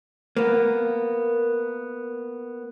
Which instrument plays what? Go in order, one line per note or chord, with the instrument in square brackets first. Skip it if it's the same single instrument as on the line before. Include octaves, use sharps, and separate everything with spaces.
[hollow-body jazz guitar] A#3 B3